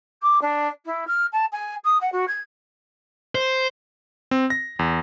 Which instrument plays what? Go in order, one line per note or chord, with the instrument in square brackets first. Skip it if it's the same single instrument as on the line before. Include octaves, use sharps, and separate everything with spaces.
[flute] D6
D4
E4
F6
A5
G#5
D#6
F#5
F#4
G#6
[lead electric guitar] C5
[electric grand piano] C4
A#6
E2